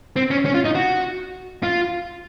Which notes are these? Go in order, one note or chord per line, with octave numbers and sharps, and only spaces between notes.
C4
C#4
C#4
F4
D#4
F#4
F4